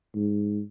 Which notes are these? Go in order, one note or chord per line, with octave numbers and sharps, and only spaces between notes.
G#2